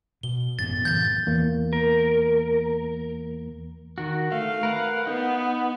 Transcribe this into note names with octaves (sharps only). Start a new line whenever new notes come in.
B2 G7
A1 F#2 B3 A6
A2 C3 E3 G6 A6
E2 E3 A#3
A#4
D#3 F#4
A3 F5
A#4 B4 F#5
B3 D#4